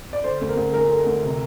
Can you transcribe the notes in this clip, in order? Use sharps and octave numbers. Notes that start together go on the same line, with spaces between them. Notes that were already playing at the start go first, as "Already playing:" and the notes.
D5
D3 C5
D2
A#4
D2
G#3 A#4
D3
D2
C3